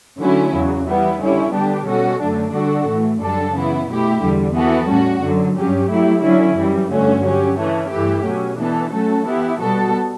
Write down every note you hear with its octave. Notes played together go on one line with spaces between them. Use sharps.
D3 F#3 A3 C#4 E4
E2 C#3 F#3
E3 G3 B3 E4
D3 G3 C#4 E4
D3 G3 B3 D4 G4
B2 G3 C#4 F#4 A4
F#2 D3 F#3 A3 D4
D3 G3 D4 F#4 A4
A2 E3 A3
F#2 D3 G3 D4 A4
C#3 E3 B3 E4
B2 A3 E4 G4
E2 D3 G3
E3 B3 F#4 A4
A2 G3 C#4 F#4
F#2 D3 F#3
G2 F#3 C#4 G4
F#3 A3 E4 G4
D3 F#3 C#4 E4
F#2 E3 G3
G2 D3 A3 C#4 F#4
F#3 C#4 G4
C#3 E3 A3 C#4
G2 E3 A3 E4 G4
B2 F#3 C#4
E3 B3 D4 A4
F#3 A3 C#4 F#4 A4
E3 B3 E4 G4
B2 G3 B3 F#4 A4